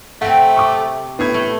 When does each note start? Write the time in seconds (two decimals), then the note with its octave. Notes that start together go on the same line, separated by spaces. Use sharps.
0.22 C3 A3 C4 F#5 D7
0.56 C#6 D6
1.19 A2 B3 G#6
1.34 A3